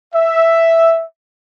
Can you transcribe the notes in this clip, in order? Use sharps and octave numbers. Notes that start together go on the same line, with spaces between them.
E5